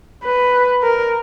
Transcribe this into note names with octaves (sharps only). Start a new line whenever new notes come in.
B4
A#4